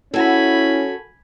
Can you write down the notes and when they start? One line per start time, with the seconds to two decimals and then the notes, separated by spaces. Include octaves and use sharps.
0.14 C#4 E4 F#4 A4 G#5 B5